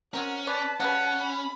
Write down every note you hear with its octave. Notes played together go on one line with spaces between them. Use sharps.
F#3 C4 C#4 A#4 F#5
B4 C#5 D5 A5
C#3 G3 C#4 B4 F#5
B5